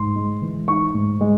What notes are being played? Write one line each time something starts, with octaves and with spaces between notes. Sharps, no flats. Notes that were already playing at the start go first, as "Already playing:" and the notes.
Already playing: G#2 C6
G#3
E3
D#4 C#6
G#2
G#3